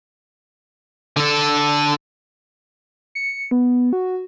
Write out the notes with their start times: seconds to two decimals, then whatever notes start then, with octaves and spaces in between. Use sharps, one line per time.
1.17 D3 A4
3.15 C#7
3.51 B3
3.93 F#4